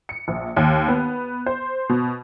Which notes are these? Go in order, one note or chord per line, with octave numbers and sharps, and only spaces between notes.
C#7
A#1
D#2
B3
C5
B2